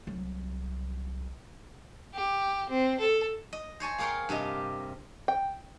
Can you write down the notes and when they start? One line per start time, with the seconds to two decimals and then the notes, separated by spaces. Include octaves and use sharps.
0.07 C2 F#3
2.14 G4
2.69 C4
3.00 A4
3.53 D#5
3.80 C5 C#5 G#5 A5
3.98 A#3 G#4 A#4 C#5 F5 G5
4.29 G2 C3 G4 D#5
5.28 G5